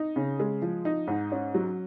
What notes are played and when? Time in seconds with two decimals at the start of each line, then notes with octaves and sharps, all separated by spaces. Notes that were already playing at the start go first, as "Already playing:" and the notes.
Already playing: D#4
0.16 C#3
0.40 G#3
0.62 F3
0.85 D#4
1.07 G#2
1.32 C#4
1.54 F#3